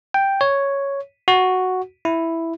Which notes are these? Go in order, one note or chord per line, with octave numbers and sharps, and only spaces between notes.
G5
C#5
F#4
E4